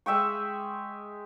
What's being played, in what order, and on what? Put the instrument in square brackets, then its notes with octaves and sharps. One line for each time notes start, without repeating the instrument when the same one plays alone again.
[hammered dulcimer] G#3 E5 G5 C#6